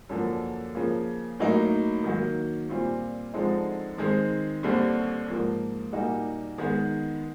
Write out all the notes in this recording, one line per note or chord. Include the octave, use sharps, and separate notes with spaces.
F#2 D3 F3 A#3
C#3 F3 A#3
A2 F#3 A#3 D#4
D#3 F#3 A#3
A#2 G3 C4 F4
D3 F3 G#3 C4 D#4
D#3 G#3 C4
D#2 D3 G3 C4
G#2 F3 A#3
A#2 G3 A#3 D#4 F#4
D#3 G#3 B3